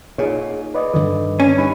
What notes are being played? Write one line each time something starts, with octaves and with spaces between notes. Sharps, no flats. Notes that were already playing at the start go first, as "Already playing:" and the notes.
A#2 D#4 G#4 C#5
B4 D5 D#5
G2 D3 D#3
C#4
G2 D#4 B5